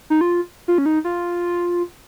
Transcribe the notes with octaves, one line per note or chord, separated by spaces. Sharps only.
D#4
F4
F4
C#4
D#4
F4